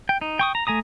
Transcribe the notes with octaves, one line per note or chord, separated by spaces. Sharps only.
G5
D#4
G5 C#6 D#6
A#5
A3 G#5 A#5 D#6